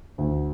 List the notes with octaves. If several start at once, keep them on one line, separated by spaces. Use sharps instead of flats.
D2